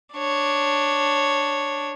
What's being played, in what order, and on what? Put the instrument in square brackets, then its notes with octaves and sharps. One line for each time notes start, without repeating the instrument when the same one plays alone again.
[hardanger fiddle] D4 C#5